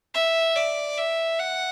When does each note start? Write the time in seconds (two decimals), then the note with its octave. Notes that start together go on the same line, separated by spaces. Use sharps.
0.14 E5
0.56 D5
0.97 E5
1.39 F#5